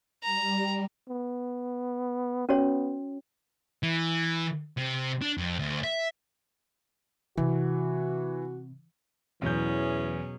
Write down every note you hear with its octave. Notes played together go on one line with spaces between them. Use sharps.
G3 A#5
B3
B3 C#4 F#4 C#5
E3
C3
D4
F2
D2
E5
C3 E3 F#4
E2 B2 E3 F#3 C#4 G#4 G6